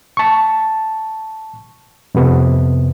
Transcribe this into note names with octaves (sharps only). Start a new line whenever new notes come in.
A5 C#6
F2 C3 B3